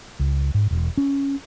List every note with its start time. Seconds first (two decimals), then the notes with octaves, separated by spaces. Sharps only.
0.19 C#2
0.54 G#2
0.71 E1
0.97 C#4